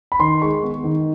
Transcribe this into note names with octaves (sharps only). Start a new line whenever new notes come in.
B5
D#3 C6
G#3 C#6
B3
D#3